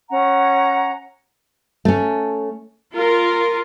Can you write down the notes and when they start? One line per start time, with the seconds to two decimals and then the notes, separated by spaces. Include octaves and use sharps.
0.10 C#4 F#5 A#5
1.85 A3 C#4
2.93 F4 A#4